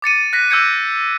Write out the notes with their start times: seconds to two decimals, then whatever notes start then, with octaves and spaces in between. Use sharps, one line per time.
0.02 D6 A6 C#7 D#7
0.33 F#6 A#6 B6
0.51 D6 E6 G6 G#6 C#7